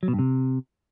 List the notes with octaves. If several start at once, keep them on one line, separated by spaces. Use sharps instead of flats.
F#3
B2
G2
C3